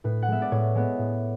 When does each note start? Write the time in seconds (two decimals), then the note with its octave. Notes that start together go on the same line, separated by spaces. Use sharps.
0.04 A2 B4
0.22 F#5
0.28 G#3 B3 E5
0.42 D5
0.51 A2 C#5
0.75 G#3 B3
0.98 A2